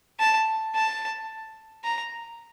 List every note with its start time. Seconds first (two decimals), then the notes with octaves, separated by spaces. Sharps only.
0.20 A5
0.75 A5
1.84 A#5